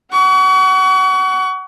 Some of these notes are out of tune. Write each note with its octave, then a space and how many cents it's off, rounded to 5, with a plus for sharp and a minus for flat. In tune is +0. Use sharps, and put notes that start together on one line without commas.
F#5 +25 C#6 +35